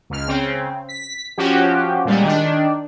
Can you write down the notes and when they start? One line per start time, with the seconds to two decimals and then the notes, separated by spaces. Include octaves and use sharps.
0.10 C#2 F6
0.28 C#3 C4
0.89 B6
1.38 F3 C#4 F#4 G4
2.05 A#2 G3 G#3
2.23 D#3 D4